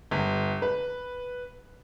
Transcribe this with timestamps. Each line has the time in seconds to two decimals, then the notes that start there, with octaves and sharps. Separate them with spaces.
0.11 G1
0.62 B4